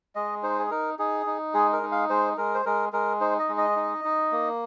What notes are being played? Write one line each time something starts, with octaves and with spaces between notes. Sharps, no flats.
G#3 D#5
D#4 C5
G#4
D#4 A#4
D#4 G#4
D#4
G#3 G#4
A#4
D#4
F5
G#3 C5
G#3 A#4
C5
G#3 A#4
G#3 A#4
D#4 C5
D#5
G#3
D#5
D#4
D#4
A#3